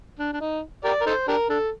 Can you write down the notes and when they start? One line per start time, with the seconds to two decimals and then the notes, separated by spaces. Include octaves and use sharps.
0.19 D4
0.33 D4
0.41 D#4
0.84 G4 A#4 D5
1.01 A#4
1.06 D#4 A4 C5
1.28 D4 G4 A#4
1.50 D4 A4